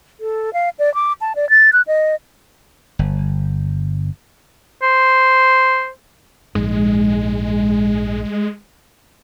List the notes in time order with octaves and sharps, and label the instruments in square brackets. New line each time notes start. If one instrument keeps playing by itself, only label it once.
[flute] A4
F5
D5
D6
A5
D5
A6
F#6
D#5
[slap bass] G1
[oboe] C5
[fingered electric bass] A#1 G#2 [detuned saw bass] G#3